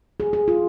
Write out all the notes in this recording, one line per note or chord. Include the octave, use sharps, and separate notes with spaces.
G#4
G#4
F4